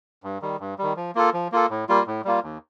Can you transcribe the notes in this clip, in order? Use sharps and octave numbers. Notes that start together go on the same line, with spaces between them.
G2
D#3 G3
G2
D#3 G3
F3
A#3 F4 A4
F3
A#3 F4 A4
A2
G3 A#3 F4
A2
G3 A#3 F4
D#2